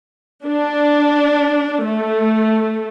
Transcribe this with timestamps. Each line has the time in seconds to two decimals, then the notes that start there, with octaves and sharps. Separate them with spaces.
0.43 D4
1.84 A3